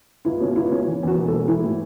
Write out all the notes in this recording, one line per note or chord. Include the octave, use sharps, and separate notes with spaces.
C#2 E4
B2 C#4
C#2 E4
B2 C#4
E3
E2 F#4
E1
A4
E1
E3 E4
A2